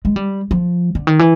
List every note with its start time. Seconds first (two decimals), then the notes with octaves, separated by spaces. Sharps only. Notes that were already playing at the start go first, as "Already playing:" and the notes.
0.05 G#3
0.16 G3
0.51 F3
0.95 D3
1.07 D#3
1.19 E3